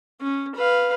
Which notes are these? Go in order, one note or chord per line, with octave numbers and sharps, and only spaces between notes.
C#4
B4 F5